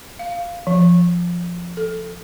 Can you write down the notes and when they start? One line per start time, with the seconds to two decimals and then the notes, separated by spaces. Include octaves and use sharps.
0.19 F5
0.67 F3
1.77 A4